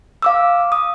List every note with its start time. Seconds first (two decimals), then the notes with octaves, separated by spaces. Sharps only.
0.22 F5 D6 E6
0.72 D#6